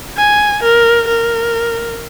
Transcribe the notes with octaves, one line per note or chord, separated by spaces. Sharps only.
G#5
A#4
A#4